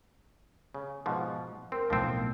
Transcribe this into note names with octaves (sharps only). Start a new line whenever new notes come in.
C#3
G#2 B2 F3
C4 A#4
B1 A2 F3 C4 G6